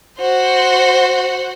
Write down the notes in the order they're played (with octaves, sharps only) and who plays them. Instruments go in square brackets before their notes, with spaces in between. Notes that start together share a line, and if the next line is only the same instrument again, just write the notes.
[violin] F#4 C5